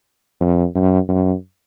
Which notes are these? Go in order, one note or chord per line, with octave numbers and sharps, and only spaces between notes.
F2
F#2
F#2